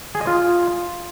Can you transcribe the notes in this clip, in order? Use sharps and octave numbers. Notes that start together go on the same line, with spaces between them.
G#4
D#5
F4